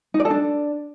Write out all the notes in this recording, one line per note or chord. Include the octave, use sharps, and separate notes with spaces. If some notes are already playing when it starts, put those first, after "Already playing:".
D#4
D5
A4
D4